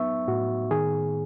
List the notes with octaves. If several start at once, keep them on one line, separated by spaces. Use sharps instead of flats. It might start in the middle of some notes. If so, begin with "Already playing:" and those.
Already playing: F#3 B3 D#4 E5 C#6
A2 F#4
D#3 G#4